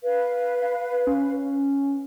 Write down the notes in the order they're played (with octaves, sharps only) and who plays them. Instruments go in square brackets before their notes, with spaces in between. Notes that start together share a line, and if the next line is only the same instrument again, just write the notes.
[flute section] B4 F5
[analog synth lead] C#4